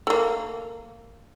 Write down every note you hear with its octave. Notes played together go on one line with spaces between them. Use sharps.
A3 A#3